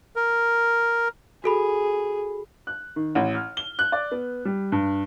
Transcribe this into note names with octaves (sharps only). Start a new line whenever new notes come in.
A#4
F#4 G#4 A4 B5
F#6
D#3
A1
F6
G7
F#6
D5
B3
G3
G2